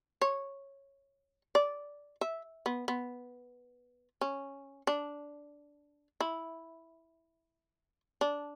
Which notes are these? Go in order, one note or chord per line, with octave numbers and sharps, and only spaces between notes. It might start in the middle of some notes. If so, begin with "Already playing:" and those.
C#5
D5
E5
B3
B3
C#4
D4
E4
D4